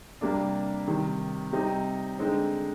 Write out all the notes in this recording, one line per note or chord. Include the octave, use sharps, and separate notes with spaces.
C3 G3 A#3 D4
C3 D#3 G3
C3 G3 C4 D#4
D3 G#3 C4 D#4